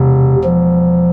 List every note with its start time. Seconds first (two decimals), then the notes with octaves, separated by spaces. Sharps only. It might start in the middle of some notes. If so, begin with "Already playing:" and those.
Already playing: E1 C3
0.44 F3